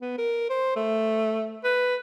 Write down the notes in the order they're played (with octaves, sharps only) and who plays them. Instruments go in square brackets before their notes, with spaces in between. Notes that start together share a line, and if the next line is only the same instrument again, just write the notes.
[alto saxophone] B3
A#4
C5
A3
B4